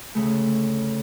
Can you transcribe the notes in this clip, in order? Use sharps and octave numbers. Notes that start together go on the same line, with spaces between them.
D2 C#3 A3